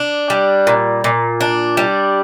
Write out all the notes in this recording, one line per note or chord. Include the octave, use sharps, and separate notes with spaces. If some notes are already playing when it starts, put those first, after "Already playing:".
Already playing: D4
G3
A#2
A#2
D4
G3